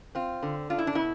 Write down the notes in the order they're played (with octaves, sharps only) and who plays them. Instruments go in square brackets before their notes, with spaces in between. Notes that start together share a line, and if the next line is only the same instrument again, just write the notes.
[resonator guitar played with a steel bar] C4 F4
D3
D4 F4
E4
D4
B2 E4